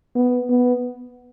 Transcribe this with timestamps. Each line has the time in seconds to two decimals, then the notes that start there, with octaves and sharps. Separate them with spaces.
0.15 B3
0.50 B3